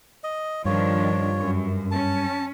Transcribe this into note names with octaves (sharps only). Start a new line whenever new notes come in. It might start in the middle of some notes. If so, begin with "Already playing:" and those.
D#5
G2 D#3 F3 D4 F4 C#5
F#2
C#4 A5